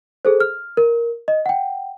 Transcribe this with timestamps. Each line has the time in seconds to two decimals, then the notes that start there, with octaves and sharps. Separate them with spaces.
0.25 G#4 A4 C5
0.40 F6
0.77 A#4
1.28 D#5
1.46 F#5 G5